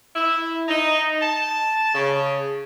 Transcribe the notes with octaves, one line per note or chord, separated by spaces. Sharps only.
E4
D#4
A5
C#3